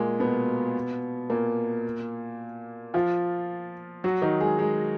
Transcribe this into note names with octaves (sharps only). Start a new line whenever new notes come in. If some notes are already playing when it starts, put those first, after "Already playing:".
Already playing: A#2 G#3 A#3
B2 B3
A#2 A#3
F3 F4
F#3 F#4
D#3 D#4
G#3 G#4
G#3 G#4